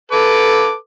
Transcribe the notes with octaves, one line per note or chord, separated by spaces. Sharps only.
A4 B4 D6